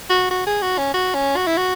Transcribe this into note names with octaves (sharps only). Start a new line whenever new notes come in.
F#4
F#4
G#4
F#4
C#4
F#4
C#4
F#4
E4
F#4